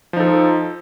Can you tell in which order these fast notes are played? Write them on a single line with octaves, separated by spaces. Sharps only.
F3 D#4 A4